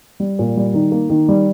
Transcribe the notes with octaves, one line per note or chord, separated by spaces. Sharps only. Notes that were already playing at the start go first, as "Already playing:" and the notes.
G3
A#2
G3
D#3
A#3
D#3
G3